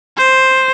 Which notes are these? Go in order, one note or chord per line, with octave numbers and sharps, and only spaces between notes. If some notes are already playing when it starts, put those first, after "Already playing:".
C5